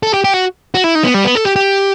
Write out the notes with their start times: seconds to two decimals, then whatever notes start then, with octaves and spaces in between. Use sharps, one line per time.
0.03 A4
0.14 G4
0.24 G4
0.33 F#4
0.75 F#4
0.84 E4
0.95 D#4
1.04 B3
1.14 G3
1.25 B3
1.35 A4
1.46 G4
1.56 G4